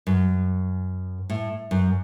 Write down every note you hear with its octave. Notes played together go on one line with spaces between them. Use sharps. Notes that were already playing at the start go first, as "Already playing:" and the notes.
F#2
A2
F#2